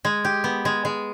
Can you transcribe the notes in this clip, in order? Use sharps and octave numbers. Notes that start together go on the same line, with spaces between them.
G#3
G4
B3
G#3
G#3